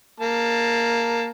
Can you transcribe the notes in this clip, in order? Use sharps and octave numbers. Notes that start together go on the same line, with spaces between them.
A#3 A5